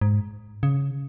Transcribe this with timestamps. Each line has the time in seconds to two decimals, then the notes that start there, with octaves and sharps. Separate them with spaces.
0.01 G#2
0.63 C#3